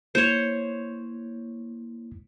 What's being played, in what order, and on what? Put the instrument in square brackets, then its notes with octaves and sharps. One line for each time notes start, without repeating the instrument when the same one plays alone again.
[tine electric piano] A#3 E4 [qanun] C5 C#5